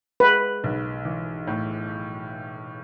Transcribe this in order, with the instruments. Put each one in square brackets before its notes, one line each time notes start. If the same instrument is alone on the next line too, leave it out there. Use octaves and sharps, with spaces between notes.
[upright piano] G#3 [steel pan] B4
[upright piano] B1
E3
A2